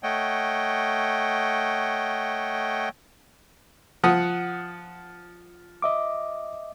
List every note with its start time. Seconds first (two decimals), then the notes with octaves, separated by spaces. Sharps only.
0.03 A3 C#5 D#5 F#5 G5
4.04 F3 F#5 D#6
5.82 D#5 E5 D6